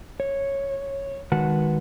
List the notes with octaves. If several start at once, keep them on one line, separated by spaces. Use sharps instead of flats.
C#5
D#3 G#3 F#4 B4 F#5 A5